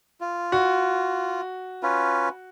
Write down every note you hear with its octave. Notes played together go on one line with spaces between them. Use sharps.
F4
F#4
C#4 F4 B4